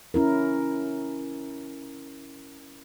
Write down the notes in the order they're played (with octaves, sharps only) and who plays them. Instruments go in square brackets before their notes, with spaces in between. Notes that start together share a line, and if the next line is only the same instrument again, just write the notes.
[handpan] C#4 E4 A#4